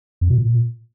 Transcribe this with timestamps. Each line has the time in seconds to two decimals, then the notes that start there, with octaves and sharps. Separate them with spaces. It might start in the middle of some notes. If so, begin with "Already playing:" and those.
0.21 F2
0.30 B2
0.38 A#2